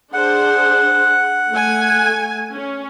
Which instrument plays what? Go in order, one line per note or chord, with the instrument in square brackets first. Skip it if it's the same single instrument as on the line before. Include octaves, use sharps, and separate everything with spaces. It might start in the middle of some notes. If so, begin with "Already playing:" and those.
[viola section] D4 G#4 C5 [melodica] F#5
[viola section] A3 G#5
C#4